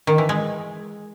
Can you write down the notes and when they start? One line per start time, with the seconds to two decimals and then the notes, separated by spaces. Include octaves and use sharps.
0.07 D#3
0.18 E3
0.29 G#3